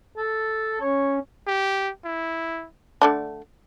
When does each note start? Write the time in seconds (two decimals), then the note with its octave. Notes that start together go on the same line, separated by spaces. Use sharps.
0.17 A4
0.81 C#4 C#5
1.47 G4
2.05 E4
3.02 D3 A3 D4